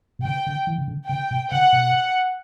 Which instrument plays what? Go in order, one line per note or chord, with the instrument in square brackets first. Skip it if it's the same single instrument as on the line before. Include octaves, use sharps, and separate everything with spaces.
[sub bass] B2
[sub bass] C#3 [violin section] G5
[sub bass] D3
E3
C#3
D3
[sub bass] C#3 [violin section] G5
[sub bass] B2
[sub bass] C#3 [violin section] F#5
[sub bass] B2